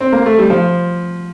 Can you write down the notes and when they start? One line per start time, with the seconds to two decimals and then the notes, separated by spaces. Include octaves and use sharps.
0.00 C4
0.12 A#3
0.26 A3
0.38 G3
0.50 F3